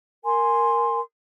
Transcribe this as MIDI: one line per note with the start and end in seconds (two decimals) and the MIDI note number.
0.24 0.99 70
0.24 0.99 80
0.24 0.99 84